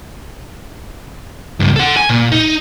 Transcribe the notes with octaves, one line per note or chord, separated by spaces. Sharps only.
C#2 G2
A4 F#5
G#5
A#2
D#4